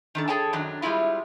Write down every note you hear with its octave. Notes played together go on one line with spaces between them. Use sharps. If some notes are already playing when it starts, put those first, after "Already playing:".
D#3 D4 A4
G#4 A4 C#5 G5 A5
F#2 D#3 F#3 D4
G3 G#3 C4 E4 F4